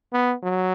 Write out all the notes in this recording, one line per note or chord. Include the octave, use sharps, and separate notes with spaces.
B3
F#3